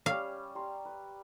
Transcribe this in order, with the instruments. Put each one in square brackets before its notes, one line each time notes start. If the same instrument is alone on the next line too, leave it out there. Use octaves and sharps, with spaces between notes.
[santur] G3 C#4 [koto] F5
[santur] G4 A#5 C6
B4